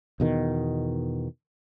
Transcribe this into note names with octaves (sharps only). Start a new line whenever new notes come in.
E2 B2 D#3